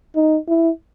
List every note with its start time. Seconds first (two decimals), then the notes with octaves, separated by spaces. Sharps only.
0.16 D#4
0.48 E4